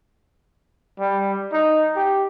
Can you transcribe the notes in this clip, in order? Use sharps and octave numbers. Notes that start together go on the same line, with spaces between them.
G3
D#4
G4